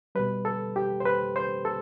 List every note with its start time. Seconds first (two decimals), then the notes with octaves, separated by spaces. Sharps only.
0.15 B2 G3 B4
0.45 A4
0.76 G4
1.00 C5
1.05 B4
1.36 C5
1.65 A4